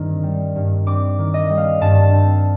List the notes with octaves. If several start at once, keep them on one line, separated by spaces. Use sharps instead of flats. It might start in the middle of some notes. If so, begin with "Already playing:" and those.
Already playing: G2 D#3 C4
G3
G2
C4 D6
D#3
D#5
G3
F5
G2 A5
C4